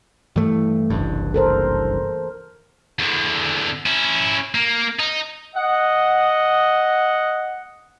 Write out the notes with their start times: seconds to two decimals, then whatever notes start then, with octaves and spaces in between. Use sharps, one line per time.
0.36 G2 E3 A3
0.90 F#1 C2 G2
1.34 A4 A#4 C5
2.99 E2 D3
3.86 C#4 E4
4.55 A#3
4.99 D#4
5.55 D#5 F#5